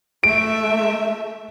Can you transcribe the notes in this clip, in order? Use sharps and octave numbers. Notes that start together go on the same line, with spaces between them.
A3 E5 D7